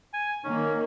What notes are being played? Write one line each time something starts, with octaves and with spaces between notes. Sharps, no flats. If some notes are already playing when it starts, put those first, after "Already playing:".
G#5
D#3 A#3 C#4